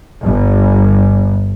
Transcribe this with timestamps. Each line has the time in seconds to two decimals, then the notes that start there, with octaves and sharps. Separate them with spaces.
0.23 G1